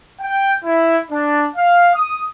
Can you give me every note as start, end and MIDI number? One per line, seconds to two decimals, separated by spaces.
0.21 0.54 79
0.65 0.98 64
1.11 1.45 62
1.56 1.94 77
1.94 2.23 87